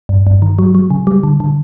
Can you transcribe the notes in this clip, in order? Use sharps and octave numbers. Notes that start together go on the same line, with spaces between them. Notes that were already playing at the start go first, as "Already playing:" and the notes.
G2
G2
D#3
F#3
F#3
C#3
G3
D3
D3